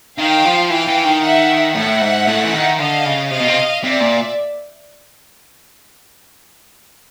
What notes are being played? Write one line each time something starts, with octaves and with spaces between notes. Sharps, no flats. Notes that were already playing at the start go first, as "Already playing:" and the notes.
D#3 F5 G5
F3
E3 F5 G5
E3
D#3
E5 F#5
A2 E5 F#5
G#2
A2
E3
D#3
D3 D#5 F5
C#3
C3 D#5 F5
B2
C3
C3 D5 E5
A#2